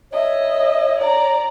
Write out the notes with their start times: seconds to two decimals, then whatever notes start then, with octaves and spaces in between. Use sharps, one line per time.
0.12 C#5 D#5 E5
0.99 D5 A#5